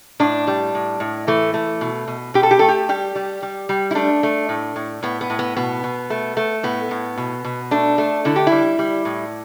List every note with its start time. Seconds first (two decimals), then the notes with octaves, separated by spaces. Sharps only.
0.20 A2 D4
0.47 G3
0.74 A2
1.00 A2
1.27 E3 A3
1.54 A3
1.81 B2
2.08 B2
2.34 B2 G4
2.43 A4
2.51 G4
2.59 A3 A4
2.69 G4
2.89 G3 G4
3.15 G3
3.42 G3
3.69 G3
3.91 E4
3.95 A3 D4
4.23 A3
4.49 A2
4.76 A2
5.03 A2 B3
5.21 B3
5.30 A2
5.39 B3
5.57 B2 B3
5.84 B2
6.10 A3
6.37 A3
6.63 A2 B3
6.91 A2
7.18 B2
7.45 B2
7.71 A3 D4
7.98 A3
8.25 D3 E4
8.36 G4
8.47 E4
8.52 G3
8.79 G3
9.05 A2